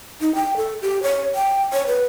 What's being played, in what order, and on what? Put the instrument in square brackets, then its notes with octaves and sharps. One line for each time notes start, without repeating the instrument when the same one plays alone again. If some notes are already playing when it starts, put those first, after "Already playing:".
[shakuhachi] D#4
G5
A4
G4
C#5
G5
C#5
B4